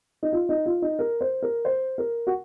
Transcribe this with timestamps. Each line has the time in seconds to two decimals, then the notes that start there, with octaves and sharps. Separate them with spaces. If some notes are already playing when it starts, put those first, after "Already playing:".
0.23 D#4
0.32 F4
0.49 D#4
0.66 F4
0.82 D#4
0.99 A#4
1.21 C5
1.43 A#4
1.65 C5
1.98 A#4
2.27 F#4